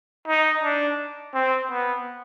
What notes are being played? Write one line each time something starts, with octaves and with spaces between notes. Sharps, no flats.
D#4
D4
C4
B3